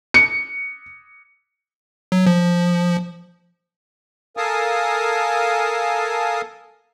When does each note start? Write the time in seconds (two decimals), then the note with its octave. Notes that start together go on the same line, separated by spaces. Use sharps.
0.14 C#7
2.12 F#3
2.27 F3
4.37 A4 A#4 F5 G#5 A5 D#6